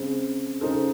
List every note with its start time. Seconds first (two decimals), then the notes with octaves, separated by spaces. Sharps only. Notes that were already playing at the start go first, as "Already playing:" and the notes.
Already playing: C#3 G#3 C4
0.61 C#3 G#3 D#4 A4 C5